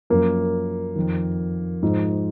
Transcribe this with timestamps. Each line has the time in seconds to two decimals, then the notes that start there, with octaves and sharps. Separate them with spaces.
0.10 F#2 F3 A#3
0.96 F2 D#3
1.83 G#2 F3